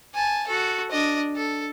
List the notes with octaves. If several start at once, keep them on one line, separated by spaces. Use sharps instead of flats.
G#5 A5
F#4 A4
D4 D#5
A4